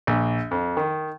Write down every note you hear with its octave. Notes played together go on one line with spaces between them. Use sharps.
A#1
F2
D#3